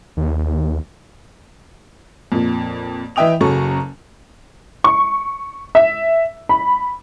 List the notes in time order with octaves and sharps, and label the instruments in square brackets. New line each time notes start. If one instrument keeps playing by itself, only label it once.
[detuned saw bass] D#2
[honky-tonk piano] F2 A#2
E3 D#5 E5 G5 D#6 F7
F#1 C#3 F#3 A4 A#5 C#6
C#6
E5
B5